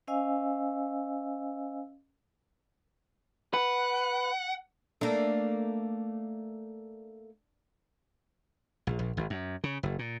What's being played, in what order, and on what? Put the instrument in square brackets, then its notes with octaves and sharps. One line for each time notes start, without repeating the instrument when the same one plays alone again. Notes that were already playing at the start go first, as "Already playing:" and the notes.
[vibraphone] C#4 C5 D#5 F5 G#5 E6
[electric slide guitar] B4 [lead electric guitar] F#5
[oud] A3 A#3 [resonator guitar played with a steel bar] D4
[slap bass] A#1
A#1
G#1
F#2
C#3
F#1
A#2